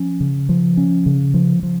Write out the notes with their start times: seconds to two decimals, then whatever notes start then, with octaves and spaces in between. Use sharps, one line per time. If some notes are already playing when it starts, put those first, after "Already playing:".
Already playing: F3 C#4
0.20 C#3
0.49 F3
0.77 C#4
1.06 C#3
1.34 F3
1.63 F3